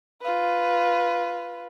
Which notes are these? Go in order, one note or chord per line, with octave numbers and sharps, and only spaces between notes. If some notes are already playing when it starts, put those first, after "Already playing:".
F4 B4